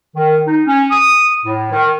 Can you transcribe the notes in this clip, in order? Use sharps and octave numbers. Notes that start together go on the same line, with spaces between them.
D#3
D#4
C#4
D#6
A2
D#3